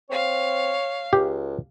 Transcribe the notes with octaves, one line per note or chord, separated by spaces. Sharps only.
C4 C#5 F5
C#2 G4